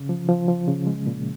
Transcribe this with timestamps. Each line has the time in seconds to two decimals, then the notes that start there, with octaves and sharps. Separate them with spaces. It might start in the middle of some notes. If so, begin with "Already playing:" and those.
Already playing: C#3
0.09 F3
0.28 F3
0.48 F3
0.68 C#3
0.87 G#3
1.06 A#2